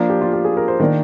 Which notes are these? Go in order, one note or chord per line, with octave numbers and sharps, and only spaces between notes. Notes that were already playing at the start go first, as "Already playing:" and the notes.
Already playing: F3 A#3 D4
G4
F4
G4
G#4
A#4
C5
D#3 A#3 D4 A#4